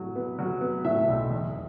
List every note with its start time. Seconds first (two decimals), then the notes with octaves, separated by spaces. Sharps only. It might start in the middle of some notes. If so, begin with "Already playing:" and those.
Already playing: A2 F#3
0.16 B3
0.39 F#3
0.61 B3
0.84 A2 E5
1.08 B1
1.30 E2